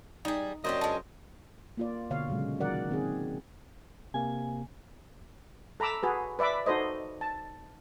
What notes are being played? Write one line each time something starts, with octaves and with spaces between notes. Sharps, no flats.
G3 D#4 G#4
F#2 A#3 D4 G4 C5 D#5
D3 G#3 F4 A5
A#3 F4 D5
B2 D3 C#5 F5
A#2 C#3 F#3 G#3
D#3 F#3 A#4 D5 F#5
D#3 C4 G#4
C3 A#3 G#5
A4 A#5 B5 D6 E6
F#4 G#4 B4
B4 D5 E5 B5 D6
D#4 F#4 A4 C5 D#5
A5